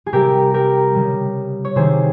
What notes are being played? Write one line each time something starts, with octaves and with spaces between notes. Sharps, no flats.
G#4
C3 G3 G4 A#4
G4 A#4
C#3 G3
C#5
C3 D#3 G3 G#4 C5